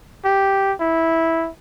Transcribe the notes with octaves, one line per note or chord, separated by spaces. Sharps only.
G4
E4